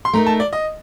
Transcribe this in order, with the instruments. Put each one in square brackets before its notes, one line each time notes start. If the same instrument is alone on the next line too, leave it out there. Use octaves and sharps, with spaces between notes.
[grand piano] C6
[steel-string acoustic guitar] A3 D#4 A#4 [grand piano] A#5
[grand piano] A5
D5
D#5